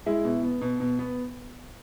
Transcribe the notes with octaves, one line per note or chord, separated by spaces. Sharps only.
G#3 E4
B2
B3
B2
B2
B3